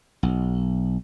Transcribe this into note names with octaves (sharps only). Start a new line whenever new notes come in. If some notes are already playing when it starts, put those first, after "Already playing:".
B1